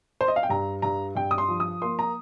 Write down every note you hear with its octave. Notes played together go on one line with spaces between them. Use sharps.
C5
D#5
F5
G5
G2 A#5
G2 A#5
G2 G5
D#6
C6
F3
D#6
A#3 C6
A#5